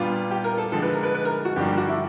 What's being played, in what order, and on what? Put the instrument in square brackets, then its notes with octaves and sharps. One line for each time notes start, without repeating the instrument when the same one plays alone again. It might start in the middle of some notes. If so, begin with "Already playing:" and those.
Already playing: [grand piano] A#2 G3 B3 D4 F4
[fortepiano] G4
A#4
A4
[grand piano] D3 F3 G#3 [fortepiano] A4
[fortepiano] B4
A#4
B4
B4
A#4
F#4
[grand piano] G2 D3 F3 A#3 D4 [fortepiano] G4
[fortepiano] G4
F#4
E4